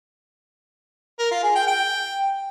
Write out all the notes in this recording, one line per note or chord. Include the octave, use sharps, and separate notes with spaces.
A#4
F4
G#4
G5
G5